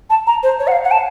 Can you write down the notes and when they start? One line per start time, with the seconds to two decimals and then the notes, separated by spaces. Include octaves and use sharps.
0.10 A5
0.27 A#5
0.43 C5
0.59 C#5
0.67 F#5
0.72 F5
0.84 F#5
0.91 A5